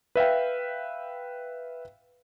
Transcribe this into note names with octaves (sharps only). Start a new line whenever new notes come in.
B4 E5 F5 G5